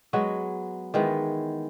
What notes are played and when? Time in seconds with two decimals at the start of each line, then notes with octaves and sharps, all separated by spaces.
0.13 F#3 G#3 B3 F#4
0.94 D#3 E3 G#3 B3